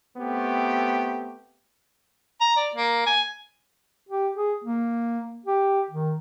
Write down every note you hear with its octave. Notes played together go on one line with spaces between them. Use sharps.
A3 B3 C4 G4
A#5
D5
A#3
G#5
G4
G#4
A#3
G4
D#3